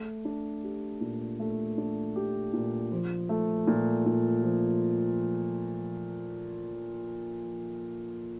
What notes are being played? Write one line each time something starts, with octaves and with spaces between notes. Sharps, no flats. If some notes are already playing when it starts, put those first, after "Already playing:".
Already playing: A3
D4
G4
A#2
A3
D4
G4
A#2
F3
A3
A#2
A#2
F3